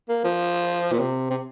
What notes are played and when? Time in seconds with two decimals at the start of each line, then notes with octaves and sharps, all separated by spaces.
0.09 A#3
0.24 F3
0.92 A#2
0.99 C3
1.30 C3